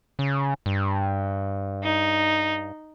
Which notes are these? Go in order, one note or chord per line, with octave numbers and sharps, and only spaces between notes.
C#3
G2
D#4